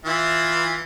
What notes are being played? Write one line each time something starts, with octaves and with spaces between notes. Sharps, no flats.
E3 E4 F4